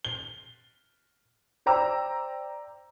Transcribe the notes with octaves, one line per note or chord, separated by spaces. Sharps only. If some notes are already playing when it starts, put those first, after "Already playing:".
G7
C5 D5 G5 A#5 D6 E6